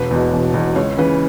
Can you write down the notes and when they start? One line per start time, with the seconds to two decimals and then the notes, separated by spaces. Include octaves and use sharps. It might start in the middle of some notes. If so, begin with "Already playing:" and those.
Already playing: E1 B4
0.11 E2 B2
0.33 E1
0.54 E2 B2
0.76 C#2 C#5
0.97 C#3 E3 B4